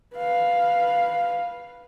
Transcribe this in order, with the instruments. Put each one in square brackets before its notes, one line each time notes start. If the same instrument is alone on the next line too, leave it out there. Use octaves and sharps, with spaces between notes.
[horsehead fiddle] B4 F5